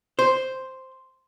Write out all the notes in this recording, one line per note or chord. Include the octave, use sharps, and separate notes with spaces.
C5